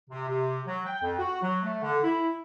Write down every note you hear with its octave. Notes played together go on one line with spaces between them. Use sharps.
C3
C3
F#3
G5
F2
F#4
F#3
A3
D3
E4